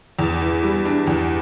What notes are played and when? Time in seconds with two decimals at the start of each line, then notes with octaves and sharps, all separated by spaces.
0.19 E2
0.41 E3
0.63 G3
0.85 D4
1.07 E2